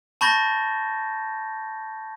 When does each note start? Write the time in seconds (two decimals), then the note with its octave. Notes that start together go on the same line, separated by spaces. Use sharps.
0.21 A5 B5 C#6 G6 A6 A#6